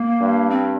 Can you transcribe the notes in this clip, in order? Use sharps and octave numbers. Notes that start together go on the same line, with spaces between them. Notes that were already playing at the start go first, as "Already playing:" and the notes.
Already playing: A#3
G2
C4